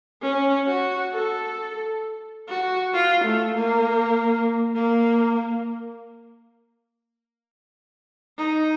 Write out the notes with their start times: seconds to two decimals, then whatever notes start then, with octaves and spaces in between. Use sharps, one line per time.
0.22 C#4
0.68 F#4
1.13 A4
2.48 F#4
2.94 F4
3.24 A3
3.54 A#3
4.75 A#3
8.38 D#4